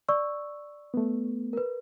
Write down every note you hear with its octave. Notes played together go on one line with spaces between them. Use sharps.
D5 C#6 E6
A3 B3
A#4 B4